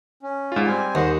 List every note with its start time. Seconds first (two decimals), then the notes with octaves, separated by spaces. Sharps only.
0.23 C#4
0.52 G#2 F4
0.66 G3 C4 G#5
0.95 D#2 C5 D#5 F#5